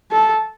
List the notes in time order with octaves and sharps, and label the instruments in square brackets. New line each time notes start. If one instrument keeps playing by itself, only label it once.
[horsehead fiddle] A4